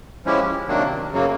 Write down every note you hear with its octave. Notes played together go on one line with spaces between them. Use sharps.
F3 G#3 C#4 E4 G4
C3 D#3 F#3 A#3 D4
F#2 C#3 F#3 A#3